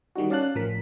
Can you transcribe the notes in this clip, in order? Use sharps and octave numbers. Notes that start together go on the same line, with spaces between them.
D#3 G3 D#4 F#4
C#4 D5 F5 A5 F#6
A1 F3 A#4 B6